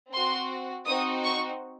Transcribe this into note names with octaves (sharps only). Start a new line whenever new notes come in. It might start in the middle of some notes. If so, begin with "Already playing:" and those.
C4 F#4 C6
C4 D#4 F#4 D#6
C#6